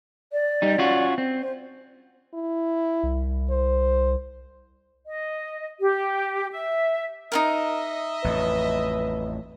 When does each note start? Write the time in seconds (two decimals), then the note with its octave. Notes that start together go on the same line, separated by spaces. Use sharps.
0.32 D5
0.62 G3 D#4
0.78 C#4 F4 F#4
1.18 C4
1.41 C5
2.34 E4
3.03 C2
3.50 C5
5.07 D#5
5.81 G4
6.51 E5
7.32 D#4 F4 A#4 D#5 E5
8.24 A1 F2 B4